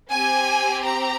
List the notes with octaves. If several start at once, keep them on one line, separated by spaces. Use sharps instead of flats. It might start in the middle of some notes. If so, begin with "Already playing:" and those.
C4 G4 G#5
A#5